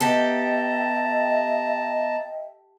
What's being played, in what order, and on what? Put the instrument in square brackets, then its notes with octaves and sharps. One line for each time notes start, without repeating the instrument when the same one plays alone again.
[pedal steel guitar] B3 [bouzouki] G4 A4 [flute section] D#5 E5 G5 [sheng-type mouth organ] A5 A#5